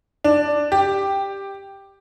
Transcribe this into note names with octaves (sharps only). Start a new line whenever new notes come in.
D4
G4